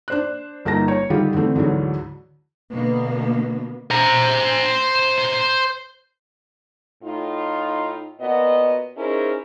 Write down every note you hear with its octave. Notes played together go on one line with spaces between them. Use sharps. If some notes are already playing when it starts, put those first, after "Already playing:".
D4 C5 F#6
G1 A#3 D#4 A5 A#6
C#5
D3 D#3 G3 F4 G4
D3 E3 A3 C4
D2 G#2 D3 E3 F#3
B2 D3 A#3 B3
C5 A#5
A2 D#4 F4
A#2 B3 F#4 D#5
C#4 D#4 E4 G#4 A#4 C5